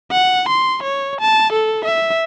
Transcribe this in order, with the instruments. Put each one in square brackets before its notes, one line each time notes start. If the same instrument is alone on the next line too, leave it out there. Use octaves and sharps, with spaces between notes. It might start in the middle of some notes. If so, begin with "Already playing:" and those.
[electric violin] F#5
C6
C#5
A5
A4
E5